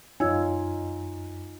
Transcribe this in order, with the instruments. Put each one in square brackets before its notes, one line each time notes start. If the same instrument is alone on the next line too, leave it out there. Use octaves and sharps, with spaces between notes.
[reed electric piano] F#2 G#5 [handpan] D#4 F4 [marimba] C#5 E6 G#6